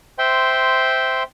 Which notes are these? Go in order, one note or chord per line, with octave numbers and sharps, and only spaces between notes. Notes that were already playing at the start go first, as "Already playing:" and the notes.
C5 E5 G5 C6